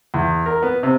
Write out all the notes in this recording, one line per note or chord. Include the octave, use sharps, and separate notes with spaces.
E2
A#4
B3
C3